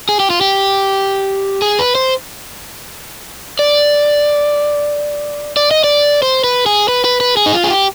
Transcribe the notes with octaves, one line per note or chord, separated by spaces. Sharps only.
G#4
G4
F4
G4
G#4
B4
C5
D5
D5
D#5
D5
C5
B4
G#4
B4
B4
B4
G#4
D#4
F4
G#4
G4